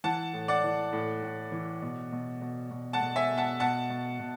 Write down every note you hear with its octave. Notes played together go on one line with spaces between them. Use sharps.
E3 F#5 A5
A2
D5 F#5
E3
A2
A2
E3
B2
B2
B2
B2
F#5 A5
B2
E5 G#5
B2
F#5 A5
B2 F#5 A5
B2
B2